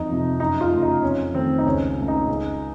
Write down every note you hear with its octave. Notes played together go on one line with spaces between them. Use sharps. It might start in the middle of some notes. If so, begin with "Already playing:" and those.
Already playing: F2 D#4
C3 F3
F#2 D#4
F4
C#3 A3
D#4
F2 C#4
D#3 A3 C4
D#4
C#2 C#4
C#3 A3
D#4
C#2